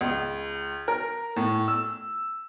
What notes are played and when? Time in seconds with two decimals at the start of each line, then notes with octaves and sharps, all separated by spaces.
0.01 C#2
0.88 A#4
1.36 A2
1.68 E6